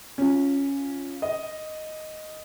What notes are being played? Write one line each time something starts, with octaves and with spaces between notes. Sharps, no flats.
C#4 F4
D#5